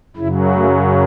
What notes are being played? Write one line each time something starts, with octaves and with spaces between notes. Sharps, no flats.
F#2 C#3 F#3 E4
A3